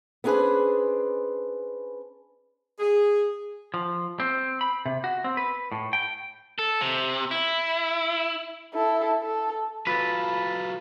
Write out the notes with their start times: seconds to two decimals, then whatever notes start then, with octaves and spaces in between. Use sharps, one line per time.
0.24 B3 C#4 D4 G#4 B4 C5
2.80 G#4
3.74 F3
4.20 C4
4.61 B5
4.86 C3
5.04 F#4
5.24 C4
5.37 B4
5.72 A2
5.93 G5
6.59 A4
6.81 C3
7.31 E4
8.74 E4 A4
9.23 A4
9.87 F#3 F4 A4 B4